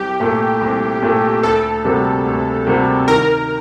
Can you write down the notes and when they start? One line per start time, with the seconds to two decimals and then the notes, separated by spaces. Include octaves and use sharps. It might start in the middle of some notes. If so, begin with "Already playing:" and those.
Already playing: C2 G4
0.20 A#2 A3
0.61 C2
1.02 A#2 A3
1.43 D2 A4
1.85 C3 G3 A#3 F#4
2.25 D2
2.67 C3 G3 A#3 F#4
3.08 D#3 A#4